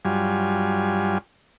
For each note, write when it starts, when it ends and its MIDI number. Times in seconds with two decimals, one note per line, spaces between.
0.05 1.18 43
0.05 1.18 54
0.05 1.18 55
0.05 1.18 65
0.05 1.18 80